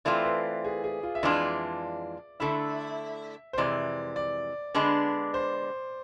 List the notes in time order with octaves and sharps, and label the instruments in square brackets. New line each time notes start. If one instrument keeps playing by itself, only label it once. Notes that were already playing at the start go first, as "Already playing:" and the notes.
[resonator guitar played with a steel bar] E3 A3 C4 F4 [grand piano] D5
[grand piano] B4
G#4
G#4
F4
E5
[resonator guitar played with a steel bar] F2 E3 G#3 D4 F4 [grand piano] D5
[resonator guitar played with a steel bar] D3 A3 E4 [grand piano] E5
[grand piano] C5
[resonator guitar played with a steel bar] F2 C3 E3 G#3 [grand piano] D5
[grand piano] D5
[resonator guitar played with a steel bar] D3 G#3 B3 D4
[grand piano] C5